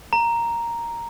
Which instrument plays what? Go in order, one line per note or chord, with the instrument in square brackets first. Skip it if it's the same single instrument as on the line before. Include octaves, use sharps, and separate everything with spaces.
[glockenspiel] A#5